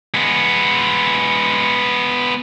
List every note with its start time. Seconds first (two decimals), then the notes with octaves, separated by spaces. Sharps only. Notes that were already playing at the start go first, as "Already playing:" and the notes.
0.14 G#3 B3